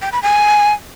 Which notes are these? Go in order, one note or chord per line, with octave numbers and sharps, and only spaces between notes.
G5
B5
G#5